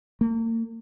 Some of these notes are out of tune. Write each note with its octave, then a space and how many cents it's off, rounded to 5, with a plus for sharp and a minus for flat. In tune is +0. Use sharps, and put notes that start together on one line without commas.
A#3 -40